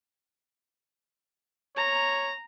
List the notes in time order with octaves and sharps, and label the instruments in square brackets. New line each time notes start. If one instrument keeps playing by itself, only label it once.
[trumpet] C#5 [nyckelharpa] A#5